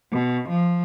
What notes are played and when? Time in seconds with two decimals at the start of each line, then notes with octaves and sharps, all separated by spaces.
0.12 B2
0.50 F3